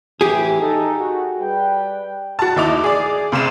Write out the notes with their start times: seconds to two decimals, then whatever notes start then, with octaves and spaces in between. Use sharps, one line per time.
0.21 A2 C3 E3 G4 G#4
0.60 D#4 A4
0.98 F#4
1.39 G3 B4 G5
2.39 F#4 A5
2.56 D#2 E4 D#5 D6 F7
2.84 G#4 D5
3.32 C#2 C3 F5 E7